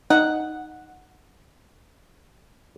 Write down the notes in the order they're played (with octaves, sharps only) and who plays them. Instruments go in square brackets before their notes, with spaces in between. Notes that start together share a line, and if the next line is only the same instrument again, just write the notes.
[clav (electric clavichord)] D#4 [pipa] F#5